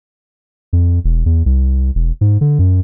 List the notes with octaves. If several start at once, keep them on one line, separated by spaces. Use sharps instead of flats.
F2
E1
E2
C2
E1
G#2
D3
F#2